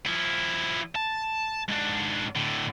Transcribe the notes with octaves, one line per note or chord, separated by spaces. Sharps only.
F3 E4
A5
G#2 D4
A2 D3